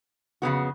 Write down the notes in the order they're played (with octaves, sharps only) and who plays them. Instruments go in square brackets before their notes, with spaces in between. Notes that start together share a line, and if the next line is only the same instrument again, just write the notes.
[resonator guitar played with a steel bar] F2 C#3 G#3 B3 F#4